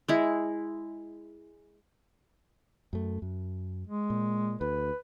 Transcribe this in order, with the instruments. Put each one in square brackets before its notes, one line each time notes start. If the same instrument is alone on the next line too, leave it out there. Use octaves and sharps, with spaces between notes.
[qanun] G#3 E4
[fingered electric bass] F#2 A3
F#2
[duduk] G#3
[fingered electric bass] A#2
[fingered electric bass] D2 [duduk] B4